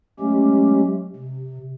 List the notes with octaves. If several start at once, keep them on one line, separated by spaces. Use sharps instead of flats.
F#3 G#3 A3 C#4 G4
C3